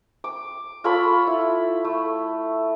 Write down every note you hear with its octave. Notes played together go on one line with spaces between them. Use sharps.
D6
F4 A4 C#5 B5
E4
A3